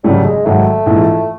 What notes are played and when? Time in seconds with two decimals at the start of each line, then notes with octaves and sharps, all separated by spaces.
0.04 G#1 F#2 C#3 F#3 G3 A3
0.25 G#3
0.45 G#1 G#2 D#3 F#3 A3
0.86 A#1 G#2 E3